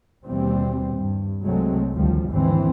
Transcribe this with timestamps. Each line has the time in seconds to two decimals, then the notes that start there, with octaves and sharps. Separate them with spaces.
0.25 D#2 B2 E3 G3 C4
0.96 G2
1.42 C2 C3 F#3 G#3 A3 C4
1.93 G#1 D2 D#3 F3 G3
2.28 G#1 D#2 D3 E3 C4